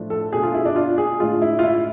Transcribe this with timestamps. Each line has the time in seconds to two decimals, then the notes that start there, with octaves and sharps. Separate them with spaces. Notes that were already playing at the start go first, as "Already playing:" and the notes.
Already playing: A2 F3 A3 D4
0.10 A4
0.33 B2 A3 D4 G#4
0.43 F4
0.54 E4
0.65 D4
0.76 F4
0.98 G#4
1.20 A2 G#3 D4 F4
1.42 E4
1.59 F4
1.63 E4